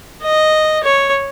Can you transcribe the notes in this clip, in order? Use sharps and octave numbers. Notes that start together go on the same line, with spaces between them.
D#5
C#5